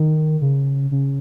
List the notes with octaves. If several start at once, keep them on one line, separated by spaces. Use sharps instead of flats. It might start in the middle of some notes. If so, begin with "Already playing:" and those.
Already playing: D#3
C#3
C#3